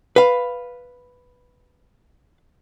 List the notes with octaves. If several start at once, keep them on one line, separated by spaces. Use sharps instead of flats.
B4 F5